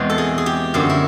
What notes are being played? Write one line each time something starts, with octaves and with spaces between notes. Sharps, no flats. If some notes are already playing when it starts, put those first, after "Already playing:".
Already playing: E2 B2 G#3 C4
A4
G#4
G#4
G4
F#2 D3 F3 A#3 F#4
E4